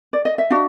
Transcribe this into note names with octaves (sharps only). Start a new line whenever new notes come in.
D5
D#5
E5
D4 F#4 F5